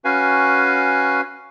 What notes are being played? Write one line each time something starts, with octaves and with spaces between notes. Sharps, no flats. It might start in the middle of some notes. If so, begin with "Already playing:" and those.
C#4 F#4 B4 F5 G#5